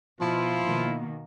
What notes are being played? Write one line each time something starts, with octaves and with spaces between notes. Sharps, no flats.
B2 F3 E4 F4
B2 D#3 A#3